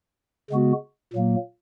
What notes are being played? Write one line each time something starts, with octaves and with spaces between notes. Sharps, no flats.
C#3 G#3 B3 F#4
A#2 F#3 A#3